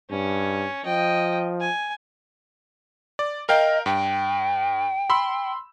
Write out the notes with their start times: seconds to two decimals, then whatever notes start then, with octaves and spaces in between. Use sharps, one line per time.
0.10 G2 C#4
0.86 F3 D#5 G5
1.61 G#5
3.19 D5
3.49 A#4 D#5 F5 G5
3.86 G2 G5
5.10 B5 C6 E6